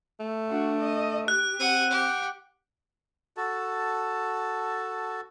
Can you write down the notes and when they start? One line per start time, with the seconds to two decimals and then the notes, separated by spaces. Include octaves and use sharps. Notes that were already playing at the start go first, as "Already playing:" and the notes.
0.20 A3
0.50 D4 F#4
0.81 D#5
1.28 G4 F#6
1.60 C4 F#5 D#7
1.91 G4 F#5
3.37 F#4 A4 A5